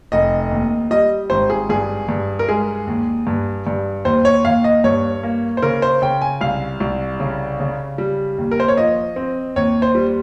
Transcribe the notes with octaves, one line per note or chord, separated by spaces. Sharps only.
F1 D#5
D#2
G3 D#5
G#1 C5
G#4
G2 G#4
G2
A#4
G#3 G#4
D#2
G2
G2
D#2 C5
C#5
D#2 F5
D#5
G2 C#5
A#3
C5
C#3 A#4
C5
C#3 G5
G#5
C2 F5
C2
C#3
C#3
G3
D#2
A#4
C5
C#5
F3 D#5
C4
D#2 C#5
C5
G3